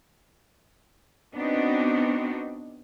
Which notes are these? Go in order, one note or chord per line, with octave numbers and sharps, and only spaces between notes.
B3 C4 D4 D#4 F#4